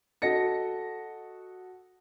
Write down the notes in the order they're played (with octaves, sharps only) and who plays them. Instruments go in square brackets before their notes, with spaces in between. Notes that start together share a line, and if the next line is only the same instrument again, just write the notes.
[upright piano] F#4 A4 D#5 A#6 C#7